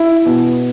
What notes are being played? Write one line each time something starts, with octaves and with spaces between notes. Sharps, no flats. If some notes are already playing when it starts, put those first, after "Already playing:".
Already playing: E4
B2